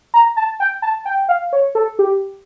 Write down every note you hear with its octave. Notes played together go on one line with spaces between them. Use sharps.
A#5
A5
G5
A5
G5
F5
C#5
A4
G4